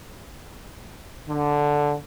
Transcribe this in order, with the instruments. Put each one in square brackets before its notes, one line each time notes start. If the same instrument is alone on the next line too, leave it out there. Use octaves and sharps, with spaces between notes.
[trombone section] D3